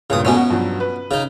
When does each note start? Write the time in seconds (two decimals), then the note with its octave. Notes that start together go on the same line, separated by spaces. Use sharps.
0.10 C#2 G2 A#2 C#3 D#6
0.25 E1 B2 A3 B3 C#4 G#5
0.36 F#4
0.50 G2 F3 F#3
0.80 B4
1.11 C#3 D#4